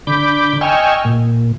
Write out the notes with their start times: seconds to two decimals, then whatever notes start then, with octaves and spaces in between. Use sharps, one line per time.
0.07 D3 B5 D6 G6
0.61 D#5 G5 G#5 C#6 E6 F6
1.05 A#2